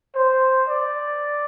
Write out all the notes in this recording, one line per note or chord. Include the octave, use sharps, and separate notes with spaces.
C5
D5